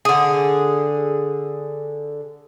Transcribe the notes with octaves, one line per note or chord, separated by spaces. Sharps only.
D3 G#4